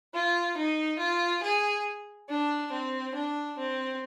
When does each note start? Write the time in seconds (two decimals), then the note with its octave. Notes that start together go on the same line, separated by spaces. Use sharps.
0.14 F4
0.57 D#4
0.99 F4
1.43 G#4
2.29 D4
2.72 C4
3.15 D4
3.58 C4